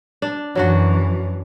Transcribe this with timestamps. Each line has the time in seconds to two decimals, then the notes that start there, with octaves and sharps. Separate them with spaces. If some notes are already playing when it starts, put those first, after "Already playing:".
0.22 D4
0.55 F#2 E3 F#3 D4 F#4